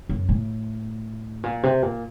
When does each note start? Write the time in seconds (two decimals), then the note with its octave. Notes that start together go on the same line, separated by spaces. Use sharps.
0.09 F#2
0.29 A2
1.43 A#2
1.63 C3
1.82 A#2